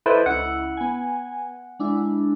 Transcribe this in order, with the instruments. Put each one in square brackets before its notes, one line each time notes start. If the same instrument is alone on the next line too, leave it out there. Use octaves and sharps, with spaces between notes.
[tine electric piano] E4 B4 C5 [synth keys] A4 D5 D#5
[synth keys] C#2 E4 [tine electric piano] F#5
[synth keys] B3 G#5
G#3 D4 E4